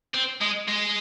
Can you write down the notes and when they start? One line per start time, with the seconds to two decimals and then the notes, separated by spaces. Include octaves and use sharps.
0.14 C4
0.41 G#3
0.68 G#3